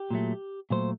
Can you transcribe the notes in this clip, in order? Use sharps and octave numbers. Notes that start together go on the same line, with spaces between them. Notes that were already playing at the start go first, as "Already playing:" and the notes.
Already playing: G4
A#2 F#3 A3
A#2 F#3 A3 C5